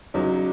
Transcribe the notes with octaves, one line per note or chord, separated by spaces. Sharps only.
E2 C#3 F#3 C#4 D#4